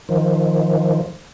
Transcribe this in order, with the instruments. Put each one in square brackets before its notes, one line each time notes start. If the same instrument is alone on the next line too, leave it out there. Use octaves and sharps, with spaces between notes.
[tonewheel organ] D#3 F3